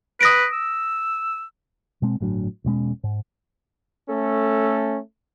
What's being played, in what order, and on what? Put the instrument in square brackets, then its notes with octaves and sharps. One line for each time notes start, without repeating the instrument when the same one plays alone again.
[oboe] B4 [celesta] D#6 A#6 D7
[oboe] E6
[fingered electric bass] B2 G#3 C4
G1 A2 F#3 D4
E1 B2 G#3 C#4
G#2
[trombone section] A3 C#4 A4